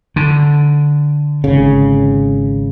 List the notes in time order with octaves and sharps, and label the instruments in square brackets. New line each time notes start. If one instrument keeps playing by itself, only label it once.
[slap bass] D3
[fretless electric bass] G#1 C#3